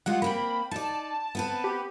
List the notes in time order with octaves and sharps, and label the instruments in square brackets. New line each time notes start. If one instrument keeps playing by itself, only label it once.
[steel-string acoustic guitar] G3 G#3 F4 [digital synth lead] F#5
[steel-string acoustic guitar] A#3 C4 G5 [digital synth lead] B5
[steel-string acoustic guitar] D#4 D5 [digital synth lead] A5
[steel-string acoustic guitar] B3 C4 B4
[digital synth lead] G4